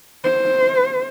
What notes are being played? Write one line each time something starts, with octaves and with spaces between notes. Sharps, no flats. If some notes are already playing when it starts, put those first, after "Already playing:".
C5